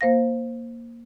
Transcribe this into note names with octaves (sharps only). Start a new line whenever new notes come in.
A#3 C5 F5 A#6